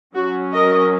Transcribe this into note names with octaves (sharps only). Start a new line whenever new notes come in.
F#3 C#4 F#4
A#4 D#5